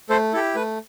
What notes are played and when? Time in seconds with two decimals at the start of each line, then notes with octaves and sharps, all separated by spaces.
0.09 A3 A4 C5
0.33 E4 G4 A4
0.56 A3 B4